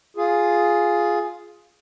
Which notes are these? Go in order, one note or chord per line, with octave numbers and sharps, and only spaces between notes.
F4 G#4